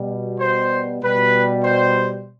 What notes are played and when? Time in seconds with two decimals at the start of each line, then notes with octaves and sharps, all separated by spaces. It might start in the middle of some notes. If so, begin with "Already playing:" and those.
Already playing: B2 G3
0.38 C5
1.01 B2 G3 B4
1.64 C5